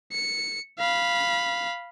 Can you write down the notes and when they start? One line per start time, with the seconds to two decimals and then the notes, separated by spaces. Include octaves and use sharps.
0.12 C#7
0.79 F5 B5